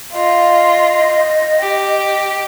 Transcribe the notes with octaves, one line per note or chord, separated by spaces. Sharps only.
F4 D#5
G4